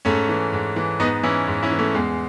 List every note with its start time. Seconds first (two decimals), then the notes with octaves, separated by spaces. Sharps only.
0.05 G#2 A3 C#4
0.29 E3
0.53 G#2
0.76 E3
0.99 G#2 B3 D#4
1.23 E3 C#4 E4
1.47 G#2
1.63 C#4 E4
1.71 E3
1.79 A3 C#4
1.94 E2 G#3